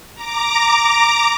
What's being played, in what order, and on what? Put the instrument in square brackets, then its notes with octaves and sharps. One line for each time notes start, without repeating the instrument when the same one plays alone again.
[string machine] A#5 D6